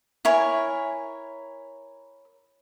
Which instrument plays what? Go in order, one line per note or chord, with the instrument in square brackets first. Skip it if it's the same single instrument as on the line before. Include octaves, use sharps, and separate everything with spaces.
[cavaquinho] E4 A#4 C#5 G#5